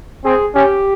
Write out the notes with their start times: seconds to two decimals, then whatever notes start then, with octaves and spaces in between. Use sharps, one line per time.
0.24 C4 G#4
0.55 C#4 G4